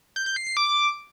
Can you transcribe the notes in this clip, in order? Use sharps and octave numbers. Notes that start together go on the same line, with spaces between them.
G6
G6
C7
C7
D6